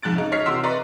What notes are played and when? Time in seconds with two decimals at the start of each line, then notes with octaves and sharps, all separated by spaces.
0.03 F2 G#2 F#6 A6 D7
0.16 C#3 D#4
0.32 C#5 D#5 C#6 F6 B6 C7
0.46 C3 E3 F#4 C6 E6 B6
0.63 B4 D5 D#5 A#5 C6 C#6